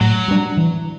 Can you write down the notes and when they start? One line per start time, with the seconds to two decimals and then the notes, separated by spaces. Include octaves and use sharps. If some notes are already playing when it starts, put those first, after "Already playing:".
0.01 A2 F#3
0.28 G3 B3 D4
0.57 E3